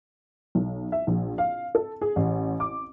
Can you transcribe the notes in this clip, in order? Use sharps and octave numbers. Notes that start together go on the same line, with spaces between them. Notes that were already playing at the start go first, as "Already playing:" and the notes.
B1
E5
A#1
F5
A4
G#4
A1
D6